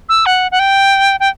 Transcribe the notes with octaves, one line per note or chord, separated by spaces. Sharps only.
E6
F#5
F#5
G5
G5